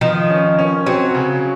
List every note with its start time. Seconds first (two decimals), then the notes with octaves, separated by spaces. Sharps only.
0.01 D#3 F3
0.30 C#4
0.59 C#4
0.86 F#3 C4
1.15 C#3